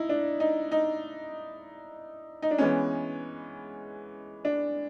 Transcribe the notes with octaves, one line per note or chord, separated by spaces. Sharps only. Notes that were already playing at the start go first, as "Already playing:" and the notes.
Already playing: D#4 E4
D4
D#4
D#4
D#4
D4
E3 G#3 B3 C#4
D4